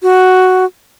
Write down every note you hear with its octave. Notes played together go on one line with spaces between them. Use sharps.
F#4